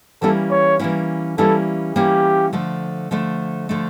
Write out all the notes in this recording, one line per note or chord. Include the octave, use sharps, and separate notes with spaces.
E3 G3 A#3 C#4 E4 A4
C#5
E3 G3 A#3 C#4 E4
E3 G3 A#3 C#4 E4 A4
E3 G3 A#3 C#4 E4 G4
D3 F3 A3
D3 F3 A3
D3 F3 A3